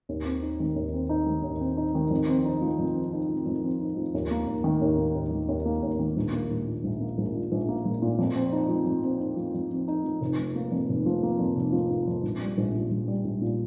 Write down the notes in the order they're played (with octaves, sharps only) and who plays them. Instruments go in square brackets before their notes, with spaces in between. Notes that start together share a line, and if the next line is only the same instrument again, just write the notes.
[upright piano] D#2
C4
D#4
D#3
D#2
C4
D#4
D#3
D#2
C4
D#4
D#3
F2
C4
D#4
F3
F2
C4
D#4
F3
F2
C4
D#4
F3
D#2
A#3
D#2
D#3
D#2
A#3
D#2
D#3
D#2
A#3
D#2
D#3
A#1
A#3
A#1
A#2
A#1
A#3
A#1
A#2
A#1
A#3
A#1
A#2
F2
C4
D#4
F3
F2
C4
D#4
F3
F2
C4
D#4
F3
F1
F3
A#3
F2
F1
F3
A#3
F2
F1
F3
A#3
F2
A#1
G3
A#1
A#2
A#1
G3
A#1
A#2